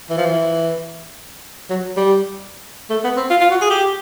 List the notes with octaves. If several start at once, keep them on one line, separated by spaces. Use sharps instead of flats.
E3
F3
E3
F#3
G3
A3
B3
C4
F4
F4
F#4
G#4
G4